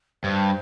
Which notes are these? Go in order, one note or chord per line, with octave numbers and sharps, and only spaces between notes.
G2 C5